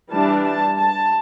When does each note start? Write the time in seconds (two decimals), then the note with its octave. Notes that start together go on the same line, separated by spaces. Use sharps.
0.12 E3 G3 D4 A5
0.45 A5
0.77 A5